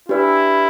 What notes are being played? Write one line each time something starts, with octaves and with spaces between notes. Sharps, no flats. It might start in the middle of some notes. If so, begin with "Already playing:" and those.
D4 E4 G4 B4 D5